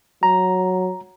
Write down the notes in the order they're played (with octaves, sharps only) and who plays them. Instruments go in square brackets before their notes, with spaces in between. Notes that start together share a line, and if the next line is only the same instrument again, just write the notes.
[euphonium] F#3 [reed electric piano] A#5